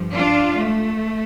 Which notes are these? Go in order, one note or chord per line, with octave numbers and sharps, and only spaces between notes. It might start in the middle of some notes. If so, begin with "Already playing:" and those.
Already playing: G2 F3
D4 F4
A3